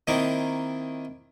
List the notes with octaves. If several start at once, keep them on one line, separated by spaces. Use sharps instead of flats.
D#3 A#3 C4 D#4 E4